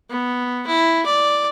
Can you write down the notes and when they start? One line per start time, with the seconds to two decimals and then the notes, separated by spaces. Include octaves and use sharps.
0.10 B3
0.67 E4
1.06 D5